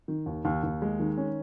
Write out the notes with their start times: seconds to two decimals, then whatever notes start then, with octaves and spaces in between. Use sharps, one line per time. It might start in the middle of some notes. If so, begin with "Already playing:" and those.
0.08 D#3
0.26 D#2
0.45 D#2
0.63 D#2
0.82 G#3
1.00 D#3
1.17 C#4